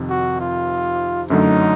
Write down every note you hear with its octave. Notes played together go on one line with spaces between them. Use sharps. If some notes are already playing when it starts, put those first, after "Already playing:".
Already playing: F2 C3 D#3
F#4
F4
F#2 D3 F#3 A3 D#4